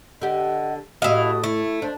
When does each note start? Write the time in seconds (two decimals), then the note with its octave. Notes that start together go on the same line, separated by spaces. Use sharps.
0.21 D3 G4 D#5 F#5
1.02 A2 E4 F#4 G4 D#5 F5 D#6
1.44 A3 E4
1.82 D4 C5